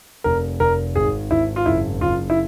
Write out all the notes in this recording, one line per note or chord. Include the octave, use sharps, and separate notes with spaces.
F1 A#4
F1 A#4
G#1 G#4
G#1 E4
F4
F#1 E4
F#1 F4
E4